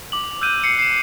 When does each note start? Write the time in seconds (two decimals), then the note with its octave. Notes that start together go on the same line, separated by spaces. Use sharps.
0.12 D6 F#7
0.41 E6 F#6 G6 D#7
0.64 C7 C#7
0.79 C7 E7